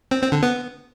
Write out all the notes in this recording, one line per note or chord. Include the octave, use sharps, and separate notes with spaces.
C4
C4
D3
B3